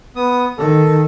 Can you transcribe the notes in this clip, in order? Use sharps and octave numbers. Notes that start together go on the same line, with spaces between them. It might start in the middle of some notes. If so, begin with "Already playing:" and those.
B3 D#6
D#3 A4